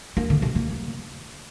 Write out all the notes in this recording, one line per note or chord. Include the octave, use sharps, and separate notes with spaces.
A#3
D3
C3
A#3